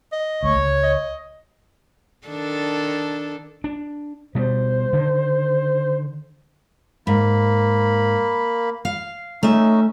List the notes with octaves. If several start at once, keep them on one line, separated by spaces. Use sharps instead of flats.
D#5
D2 A3 C#5
C#2
D#5
D#3 D4 A4
D4
B2 G3 C5
D3 D#3
G#2 A#3 B5
F5
A3 C#4 D#4 E5